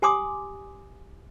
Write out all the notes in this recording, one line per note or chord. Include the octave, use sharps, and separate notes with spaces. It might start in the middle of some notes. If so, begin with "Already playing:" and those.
G4 G#5 C6 D6 D#6